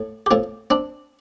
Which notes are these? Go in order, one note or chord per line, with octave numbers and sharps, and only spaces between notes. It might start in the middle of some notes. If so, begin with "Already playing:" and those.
Already playing: A2
G4
A2 C4 F4
C4 D4